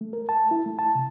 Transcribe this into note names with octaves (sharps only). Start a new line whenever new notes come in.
A3
A#4
A5
E4
A3
A5
C3